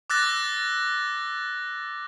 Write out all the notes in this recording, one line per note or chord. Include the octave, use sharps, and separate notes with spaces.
D6 E6 F#6 A6 A#6